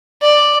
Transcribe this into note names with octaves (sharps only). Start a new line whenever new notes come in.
D5